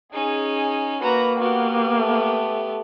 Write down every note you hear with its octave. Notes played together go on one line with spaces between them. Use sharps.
C#4 D#4 G#4
A#3 F#4 B4 A#5
B3 F#4 G4
A3